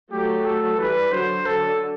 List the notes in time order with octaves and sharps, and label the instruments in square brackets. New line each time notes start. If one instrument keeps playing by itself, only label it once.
[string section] F#3 A3 [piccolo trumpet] G4
[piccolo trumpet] A4
[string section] E3 G3 [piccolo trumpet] B4
[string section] D3 F#3 [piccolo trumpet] C5
[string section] D3 F#3 [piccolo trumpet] A4